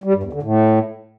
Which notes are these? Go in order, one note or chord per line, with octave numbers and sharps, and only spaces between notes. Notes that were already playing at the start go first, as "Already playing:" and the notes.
G3
G2
E2
D3
A2